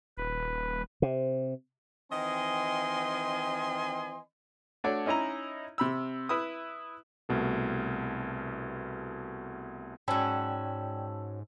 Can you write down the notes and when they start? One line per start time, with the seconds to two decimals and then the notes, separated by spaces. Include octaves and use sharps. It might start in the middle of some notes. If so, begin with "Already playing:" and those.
0.17 D#1 B4
1.02 C3
2.12 D#3 E3 C4 D#5 G#5 C6
4.84 A3 D4 F#4 C#5 D5
5.06 C#4 D#4 E4 D#5 A#5
5.78 C3 B5 E6
6.29 E4 B4 E5 D#6
7.29 C2 B2 A3
10.08 G#2 F#3 C#4 D5 G5 A5 B5 E6